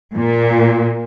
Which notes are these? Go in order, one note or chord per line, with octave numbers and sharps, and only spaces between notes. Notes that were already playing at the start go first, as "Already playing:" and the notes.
A#2